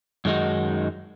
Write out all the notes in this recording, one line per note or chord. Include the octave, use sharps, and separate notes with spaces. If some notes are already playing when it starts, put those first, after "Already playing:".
F#2 D#3 G#3 D#4 F#4